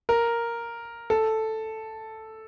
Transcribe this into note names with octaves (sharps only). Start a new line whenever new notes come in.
A#4
A4